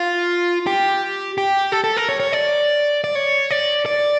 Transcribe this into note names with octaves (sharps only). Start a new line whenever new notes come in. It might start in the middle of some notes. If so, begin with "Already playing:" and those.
Already playing: F4
G4
G4
A4
A4
A#4
C#5
C#5
D5
D5
C#5
D5
D5